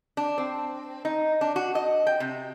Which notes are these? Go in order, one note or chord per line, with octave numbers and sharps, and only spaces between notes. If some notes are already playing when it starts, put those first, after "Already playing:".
D4
C4
D#4
D4
F#4
D#5
G5
C3